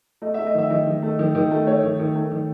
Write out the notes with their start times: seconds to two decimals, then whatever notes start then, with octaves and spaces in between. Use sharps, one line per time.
0.22 A3 D#5
0.34 E5
0.39 A3
0.46 D#5
0.54 D#3 E5
0.70 D#3 D#5
0.87 D#3
1.02 A3
1.19 D#3
1.35 D#3
1.51 A3
1.67 A3 C#5
1.83 D#3
2.00 D#3
2.15 A3
2.32 D#3